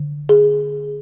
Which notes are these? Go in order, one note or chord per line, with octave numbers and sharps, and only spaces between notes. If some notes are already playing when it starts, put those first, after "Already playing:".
Already playing: D3
G#4